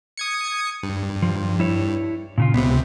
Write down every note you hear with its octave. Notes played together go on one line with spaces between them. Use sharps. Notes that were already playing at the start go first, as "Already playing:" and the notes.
D#6 G#6 C#7
G2
F3
E4 C#5
A#2 C#3 F4
C#2 C3 B3